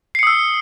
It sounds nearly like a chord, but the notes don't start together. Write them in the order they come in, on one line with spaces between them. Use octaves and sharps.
C7 C#7 D#6 E6